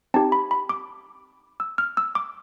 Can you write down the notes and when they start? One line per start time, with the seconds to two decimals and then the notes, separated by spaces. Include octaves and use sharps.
0.14 C4 D#4 G4 A5
0.32 B5
0.51 B5
0.69 D6
1.60 E6
1.78 F6
1.97 E6
2.15 D6